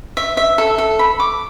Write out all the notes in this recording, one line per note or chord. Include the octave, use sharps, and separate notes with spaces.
E5
E5
A4
A4
B5
D6